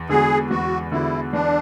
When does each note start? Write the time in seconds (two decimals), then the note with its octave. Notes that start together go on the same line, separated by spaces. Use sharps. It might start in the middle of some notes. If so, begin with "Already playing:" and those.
Already playing: E2
0.09 D3 G#3 B3 F#4 G#4
0.50 E2 F#4
0.92 D3 G#3 B3 E4 F#4
1.33 E2 D4